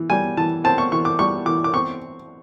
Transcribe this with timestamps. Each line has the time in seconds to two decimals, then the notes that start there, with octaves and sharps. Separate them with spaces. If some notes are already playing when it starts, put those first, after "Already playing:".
Already playing: E3
0.10 G3 G#5
0.37 E3 A5
0.64 C4 A5
0.78 C#6
0.92 E3 C#6
1.05 D6
1.19 G3 C#6
1.46 E3 D6
1.64 D6
1.74 C4 C#6